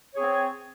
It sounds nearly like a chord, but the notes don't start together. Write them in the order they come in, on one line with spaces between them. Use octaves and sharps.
C#5 G#4 C4